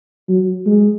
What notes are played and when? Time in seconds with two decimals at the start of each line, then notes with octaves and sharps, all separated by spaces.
0.28 F#3
0.66 G#3